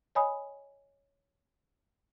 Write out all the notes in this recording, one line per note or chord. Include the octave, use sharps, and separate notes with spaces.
C#5 D#5 G#5 B5 D#6